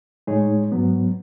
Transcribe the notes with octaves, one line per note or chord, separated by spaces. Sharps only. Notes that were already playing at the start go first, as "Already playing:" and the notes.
A2 G#3 D#4 G#4 C#5
G#2 F#3 B3